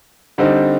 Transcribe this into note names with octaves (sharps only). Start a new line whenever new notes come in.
D3 G3 C4 D#4